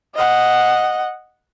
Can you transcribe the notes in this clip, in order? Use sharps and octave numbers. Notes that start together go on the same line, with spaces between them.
D#5 F#5